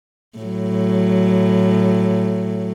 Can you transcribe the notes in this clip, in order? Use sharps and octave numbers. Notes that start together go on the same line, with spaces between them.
A2 F#3